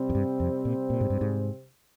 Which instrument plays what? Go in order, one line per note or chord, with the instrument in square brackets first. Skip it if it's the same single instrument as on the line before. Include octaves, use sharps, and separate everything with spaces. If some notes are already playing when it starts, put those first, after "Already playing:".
Already playing: [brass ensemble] C3 G3 C4
[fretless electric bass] F2
G2
F2
A#2
A#2
G#2
G2
G#2